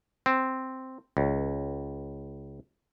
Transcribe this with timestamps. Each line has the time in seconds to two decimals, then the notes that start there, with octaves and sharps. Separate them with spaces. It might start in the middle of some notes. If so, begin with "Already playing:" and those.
0.26 C4
1.17 C#2